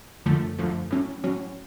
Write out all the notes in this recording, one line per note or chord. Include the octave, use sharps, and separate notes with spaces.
F#2 D3 F3 A3
F#2 D3 F3 A3
A2 F#3 C#4
A2 F#3 C#4